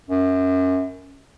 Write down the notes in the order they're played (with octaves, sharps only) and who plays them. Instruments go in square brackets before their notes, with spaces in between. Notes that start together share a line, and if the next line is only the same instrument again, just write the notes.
[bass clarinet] F#2